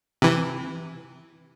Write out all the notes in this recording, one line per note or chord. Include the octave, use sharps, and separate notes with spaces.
C3 E3